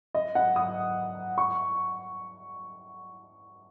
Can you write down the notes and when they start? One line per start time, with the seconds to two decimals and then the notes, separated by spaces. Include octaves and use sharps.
0.15 D#5
0.35 F#5
0.56 D#6
1.38 C#6